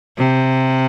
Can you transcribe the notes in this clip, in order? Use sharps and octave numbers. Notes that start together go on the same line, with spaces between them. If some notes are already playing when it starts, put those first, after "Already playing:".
C3